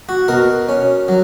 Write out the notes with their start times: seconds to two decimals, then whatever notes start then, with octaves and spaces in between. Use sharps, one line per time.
0.09 F#4
0.28 B2 A#4
0.69 C#4
1.08 F#3